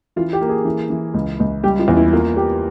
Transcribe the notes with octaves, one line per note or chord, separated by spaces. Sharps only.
E3 F4
G4
A#3
G#4
E3
E3
C#2
C#2
G3 G4
F4
E2
E4
A#3 F4
A#3 G4